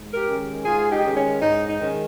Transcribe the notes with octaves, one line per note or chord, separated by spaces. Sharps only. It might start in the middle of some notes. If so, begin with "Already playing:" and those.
Already playing: G#2
G4 A#4
D#3 G#3 C#4
G#2 F4 G#4
D#4 G4
D#3 G#3 C#4
C#4
G#2 D#4
D#4
D#3 G#3 C#4